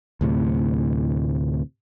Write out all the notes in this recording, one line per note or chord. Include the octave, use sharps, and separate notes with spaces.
D2 A2 C3